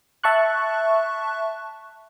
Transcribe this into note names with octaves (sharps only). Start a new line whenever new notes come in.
E5 A5 C#6 F#6